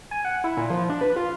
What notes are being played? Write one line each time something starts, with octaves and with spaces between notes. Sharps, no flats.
G#5
F#5
E4
A#2
F3
D4
B4
F4